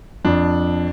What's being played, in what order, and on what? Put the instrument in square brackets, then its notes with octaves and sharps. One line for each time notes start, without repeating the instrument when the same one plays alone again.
[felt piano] F2 [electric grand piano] D4